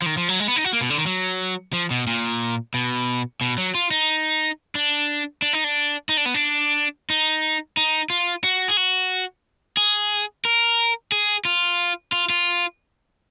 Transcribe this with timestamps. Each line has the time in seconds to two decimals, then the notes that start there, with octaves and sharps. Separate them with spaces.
0.02 F3
0.06 D#3
0.17 F3
0.29 F#3
0.40 G#3
0.48 B3
0.56 D#4
0.65 F#4
0.73 A#3
0.81 B2
0.90 D3
0.98 D#3
1.06 F#3
1.73 F3
1.91 B2
2.07 A#2
2.74 B2
3.41 B2
3.58 F#3
3.75 F4
3.91 D#4
4.75 D4
5.42 D4
5.53 D#4
5.64 D4
6.09 D#4
6.17 D4
6.26 B3
6.34 D4
7.10 D#4
7.77 D#4
8.10 F4
8.44 F#4
8.68 G#4
8.77 F#4
9.77 G#4
10.45 A#4
11.12 G#4
11.45 F4
12.12 F4
12.30 F4